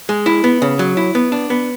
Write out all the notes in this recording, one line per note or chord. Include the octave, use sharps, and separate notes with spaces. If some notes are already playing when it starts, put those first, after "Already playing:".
G#3
E4
B3
C#3
F#3
E4
B3
D4
B3